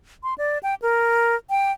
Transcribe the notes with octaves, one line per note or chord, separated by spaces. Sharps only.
C6
D5
G5
A#4
G5